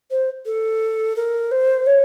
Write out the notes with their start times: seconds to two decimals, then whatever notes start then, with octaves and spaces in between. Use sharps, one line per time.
0.10 C5
0.45 A4
1.16 A#4
1.51 C5
1.86 C#5